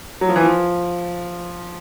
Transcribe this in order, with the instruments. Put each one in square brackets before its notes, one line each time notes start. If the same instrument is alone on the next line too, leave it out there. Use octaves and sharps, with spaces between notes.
[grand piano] F#3
F3
E3
F3